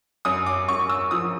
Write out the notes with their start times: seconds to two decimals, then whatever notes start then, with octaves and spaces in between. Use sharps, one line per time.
0.25 F#2 D#6
0.46 D6
0.68 F#2 C#6
0.89 E6
1.11 F3 D#6